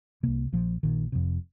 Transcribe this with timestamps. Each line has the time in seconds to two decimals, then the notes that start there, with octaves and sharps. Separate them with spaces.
0.23 C2 C3 A#3
0.52 A#1 A#2 F3
0.83 A#1 A#2 D#3
1.12 F1 F2 C3